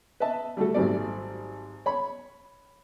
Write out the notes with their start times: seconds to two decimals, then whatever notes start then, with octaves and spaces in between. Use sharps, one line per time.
0.20 B4 D#5 E5 A5
0.57 G3 A3 F#4 A4
0.74 G#1 G#2 F#3 G3 A3 D5
1.86 C#5 B5